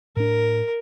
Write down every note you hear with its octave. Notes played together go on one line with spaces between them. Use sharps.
A2 D4 A#4